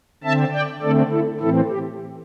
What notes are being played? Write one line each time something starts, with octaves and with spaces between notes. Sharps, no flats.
D3 C4 E5 A5
D5 G5
D3 A3 C4 A4 D5
E4 A4
A2 E3 C4 E4 A4
G4